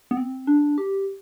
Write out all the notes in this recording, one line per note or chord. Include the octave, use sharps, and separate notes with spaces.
B3
C4
D4
G4